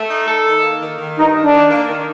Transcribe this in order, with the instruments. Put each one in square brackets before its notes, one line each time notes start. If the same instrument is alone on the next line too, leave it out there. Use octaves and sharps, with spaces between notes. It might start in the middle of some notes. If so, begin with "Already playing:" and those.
Already playing: [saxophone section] A3
D#4
A4
D#3
A#3
D#3
D#3
[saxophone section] G2 [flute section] D#4
[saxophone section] D#3
[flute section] D4
[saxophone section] D#3
A#3
D#3